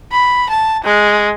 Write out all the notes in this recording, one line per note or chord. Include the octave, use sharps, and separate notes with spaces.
B5
A5
G#3